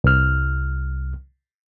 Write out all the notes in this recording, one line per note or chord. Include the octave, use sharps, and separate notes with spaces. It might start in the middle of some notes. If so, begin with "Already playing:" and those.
C2 F6